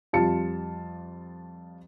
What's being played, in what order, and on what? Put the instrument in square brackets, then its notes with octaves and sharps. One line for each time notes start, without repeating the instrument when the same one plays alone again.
[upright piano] F2 G3 F4 A5 C#7